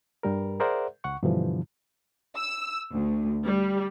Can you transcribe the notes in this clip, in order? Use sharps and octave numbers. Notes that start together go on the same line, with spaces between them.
G2 G3 A#4
G#4 A#4 C5 D5 E5 F#5
C#2 F#5 C#6
G2 B2 D3 E3 F3
E6
D2
G3